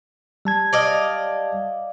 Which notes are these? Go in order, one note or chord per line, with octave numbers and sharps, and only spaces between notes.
G3 A5 G#6
D5 D#5 F5